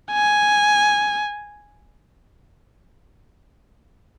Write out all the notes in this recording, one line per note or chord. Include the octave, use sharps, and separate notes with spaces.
G#5